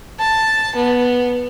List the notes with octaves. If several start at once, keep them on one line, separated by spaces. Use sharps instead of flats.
A5
B3